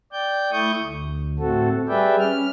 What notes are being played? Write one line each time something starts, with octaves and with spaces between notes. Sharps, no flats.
D5 G5 G6
A3 E4 C#6 D#6 G6
D2
A2 A3 C4 F#4 A4
G3 G#4 B4 D5 E5 G5
C#4 F6